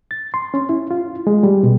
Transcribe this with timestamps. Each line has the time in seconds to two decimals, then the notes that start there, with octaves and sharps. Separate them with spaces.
0.11 A6
0.34 C6
0.54 C#4
0.69 E4
0.91 F4
1.27 G#3
1.43 G3
1.63 B2